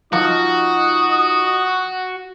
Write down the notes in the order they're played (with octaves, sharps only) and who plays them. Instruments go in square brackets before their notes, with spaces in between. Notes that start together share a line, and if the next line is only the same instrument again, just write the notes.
[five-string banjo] F3 [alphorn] D#4 [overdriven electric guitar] F#4 [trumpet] D#6